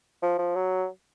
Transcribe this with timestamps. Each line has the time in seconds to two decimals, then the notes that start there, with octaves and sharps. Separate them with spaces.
0.22 F3
0.39 F3
0.55 F#3